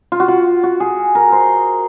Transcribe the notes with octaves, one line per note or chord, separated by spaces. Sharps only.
F4
F#4
F4
F#4
G#4
A#4
C5